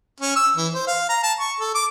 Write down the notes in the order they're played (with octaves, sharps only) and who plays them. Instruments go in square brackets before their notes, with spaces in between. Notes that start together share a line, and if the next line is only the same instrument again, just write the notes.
[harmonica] C#4
E6
E3
C5
F5
A#5
A5
C#6
A4
D6